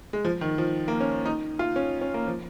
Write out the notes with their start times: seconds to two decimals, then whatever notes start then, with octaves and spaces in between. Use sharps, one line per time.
0.13 G#3
0.25 F3
0.41 D#3
0.58 F3
0.88 A#3
1.00 C#4
1.25 D#4
1.59 F4
1.76 C#4
2.01 C#4
2.14 A#3
2.27 F3